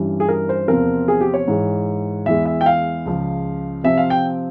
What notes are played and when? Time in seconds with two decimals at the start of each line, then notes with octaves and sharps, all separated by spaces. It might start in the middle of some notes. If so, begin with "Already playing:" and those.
Already playing: G2 E3 G3 C#4
0.20 G#4
0.29 A#4
0.49 C5
0.68 E2 C3 F3 C4 A#4
1.08 G#4
1.21 G4
1.34 C#5
1.47 G#2 E3 G#3
2.26 E2 E3 G#3 E5
2.46 E5
2.61 G5
2.66 F5
3.06 C#2 C#3 F3
3.84 C3 F3 C4 E5
3.97 F5
4.10 G5